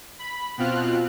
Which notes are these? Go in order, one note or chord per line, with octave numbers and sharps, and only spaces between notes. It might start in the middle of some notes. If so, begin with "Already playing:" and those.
B5
B2 C4 F4 F6 F#6